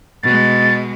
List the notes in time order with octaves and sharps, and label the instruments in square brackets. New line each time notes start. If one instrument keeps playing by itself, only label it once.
[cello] B2 G#3 [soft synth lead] A6